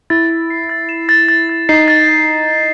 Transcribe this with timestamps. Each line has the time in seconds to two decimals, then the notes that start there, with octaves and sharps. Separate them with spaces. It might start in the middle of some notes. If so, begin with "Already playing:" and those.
0.10 E4 A6
0.30 A6
0.50 C7
0.69 A6
0.89 E7
1.09 A6
1.28 A6
1.49 A6
1.69 D#4 C7
1.88 A6
2.08 A6